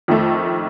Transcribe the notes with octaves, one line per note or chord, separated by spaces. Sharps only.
F2 D#3 A3